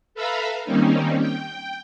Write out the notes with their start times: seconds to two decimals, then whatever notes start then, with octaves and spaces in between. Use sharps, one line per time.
0.14 A4 B4 E5 F5 A#5 B5
0.64 D#3 G3 A#3 C4 C#4 D#4
1.19 G5